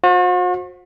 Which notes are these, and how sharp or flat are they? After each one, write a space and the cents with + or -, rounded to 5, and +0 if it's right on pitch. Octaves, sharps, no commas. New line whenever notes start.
F#4 -45 C5 +20